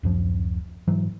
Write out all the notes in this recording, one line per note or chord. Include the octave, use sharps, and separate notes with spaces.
D1 F#2 F3
G#2 E3 F#3